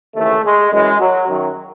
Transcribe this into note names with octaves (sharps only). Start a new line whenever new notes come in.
D#2 C#3 E3 A3
G#3
F#2 E3 G#3
F#3
F#2 D#3 F#3